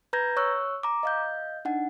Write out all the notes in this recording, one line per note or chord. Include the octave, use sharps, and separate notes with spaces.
B4 A#5 G6 G#6 A#6
C#5 C#6 E6 F#6
A#5 D6
D#5 F5 G6
D4 D#4 F#5